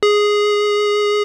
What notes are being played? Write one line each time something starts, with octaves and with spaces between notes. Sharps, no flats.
G#4